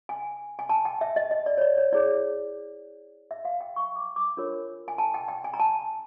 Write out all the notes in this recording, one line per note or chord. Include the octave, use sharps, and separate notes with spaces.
G#5
G#5
A5
G5
E5
D#5
D#5
D5
C#5
D5
C#5
E4 G#4 C#5 D5
E5
F5
G5
C#6
D6
D6
D4 F4 A#4 C#5
G#5
A5
G5
G5
G#5
A#5
A5